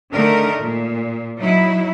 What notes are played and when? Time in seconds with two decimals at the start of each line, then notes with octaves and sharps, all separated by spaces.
0.12 D3 D#3 A3 A#4
0.62 A#2
1.39 F#3 D#4 E4